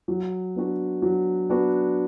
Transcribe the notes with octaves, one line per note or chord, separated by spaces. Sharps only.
F#3
B3 D4 F#4
F#3
B3 D4 F#4